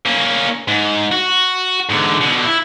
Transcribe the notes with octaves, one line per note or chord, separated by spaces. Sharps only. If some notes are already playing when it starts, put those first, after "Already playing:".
A#3 C#4
G#2
F#4
G#2 D3
B2 D3
E4